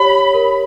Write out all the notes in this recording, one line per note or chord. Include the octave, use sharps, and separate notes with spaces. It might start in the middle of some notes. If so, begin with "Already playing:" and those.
Already playing: G4 C#5 B5
A#4